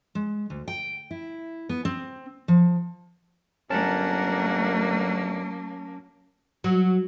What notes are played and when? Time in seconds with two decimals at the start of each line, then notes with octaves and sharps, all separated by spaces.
0.15 G#3
0.50 D2
0.68 G5
1.11 E4
1.69 B3
1.85 C4
2.48 F3
3.70 G1 F#3 A#3 C#4 A#4 F#5 A5
6.64 F#3